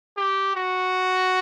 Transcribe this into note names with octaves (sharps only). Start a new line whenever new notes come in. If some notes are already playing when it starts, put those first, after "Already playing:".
G4
F#4